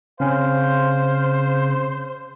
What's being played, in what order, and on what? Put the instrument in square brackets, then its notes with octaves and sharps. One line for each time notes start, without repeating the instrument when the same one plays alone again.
[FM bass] C#3 [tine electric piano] C4 C#4 [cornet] C5 [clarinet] F5